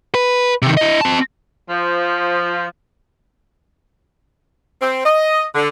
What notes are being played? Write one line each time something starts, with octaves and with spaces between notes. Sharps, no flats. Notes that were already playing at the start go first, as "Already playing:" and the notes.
B4
C3 D#3
E4 D#5
C4 A5
F3
C4
D#5
D3